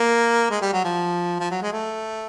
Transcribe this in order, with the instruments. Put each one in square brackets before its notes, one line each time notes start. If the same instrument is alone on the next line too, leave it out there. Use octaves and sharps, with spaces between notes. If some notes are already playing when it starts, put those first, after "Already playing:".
Already playing: [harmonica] A#3
G#3
G3
F#3
F3
F3
F#3
G#3
A3